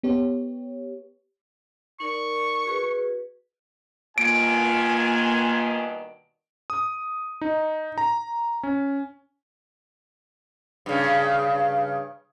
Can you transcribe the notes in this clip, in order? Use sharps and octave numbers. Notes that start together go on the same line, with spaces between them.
B3 G4 C#5
D#4 A#4 D5 C#6
F#4 G#4 B4
G2 B2 D#3 A#3 F4 G#5 D7
D#6
D#4
A#5
C#4
G2 C#3